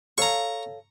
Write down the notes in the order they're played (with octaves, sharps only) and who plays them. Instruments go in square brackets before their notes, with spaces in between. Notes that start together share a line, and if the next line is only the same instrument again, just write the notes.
[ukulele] A4 C#5 F5 [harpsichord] A#5 C#6